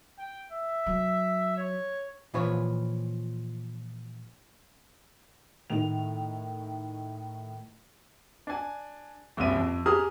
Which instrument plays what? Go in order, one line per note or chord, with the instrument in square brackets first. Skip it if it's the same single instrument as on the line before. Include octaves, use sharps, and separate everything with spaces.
[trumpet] G5
E5
[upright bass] F#3
[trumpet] C#5
[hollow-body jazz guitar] A#2 E3 F3 B4 C#5
[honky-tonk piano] A2 D#3 F7
[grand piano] D4 G#5
F#1 C2 A#2 E5 D#7
F2
G4 G#4 A#5 D#6 F6